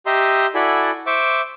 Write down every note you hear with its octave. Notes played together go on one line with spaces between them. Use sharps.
G4 D#5 E5 A#5 C6
E4 F#4 A4 D5 G#5 B5
C5 E5 C#6 D6